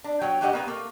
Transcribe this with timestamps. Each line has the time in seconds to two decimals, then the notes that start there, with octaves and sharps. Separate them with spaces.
0.04 D4
0.21 F#3 B3 C#5 G5
0.41 A2 F#3 D4 G4 D#5 F#5
0.53 A#3 B3 B4
0.67 A3 A#3